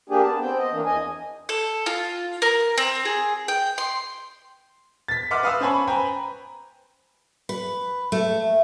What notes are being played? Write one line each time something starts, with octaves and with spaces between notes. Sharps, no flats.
A#3 D4 G4 G#4
B3 A5
B3 C4 G5
D#5
E3 A#3 D4
E2 D#5 G#5
A4
F4
A#4
C4
G#4
G5
C6
A6 B6
D#5 E5 F#5 C6 D6 F6
B4 F5 D#6 E6
C#4 C5 G#5 A5 B5 C#6
B4 C5 G5 G#5 A#5 B5
B4
A3